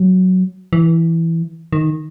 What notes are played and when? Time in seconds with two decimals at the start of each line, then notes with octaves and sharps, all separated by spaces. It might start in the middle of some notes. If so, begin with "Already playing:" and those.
Already playing: F#3
0.73 E3
1.73 D#3